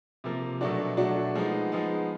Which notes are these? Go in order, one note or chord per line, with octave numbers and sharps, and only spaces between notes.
C3 F3 A#3
B2 F#3 A3 D4 F#4
B2 F#3 A3 D4 F#4
F3 G#3 B3 D#4
F3 G#3 B3 D#4